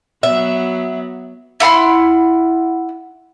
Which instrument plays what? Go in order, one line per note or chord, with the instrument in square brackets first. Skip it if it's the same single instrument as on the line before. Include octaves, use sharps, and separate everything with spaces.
[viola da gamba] F#3 B3 [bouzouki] E5
[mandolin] E4 F#5 B5 C6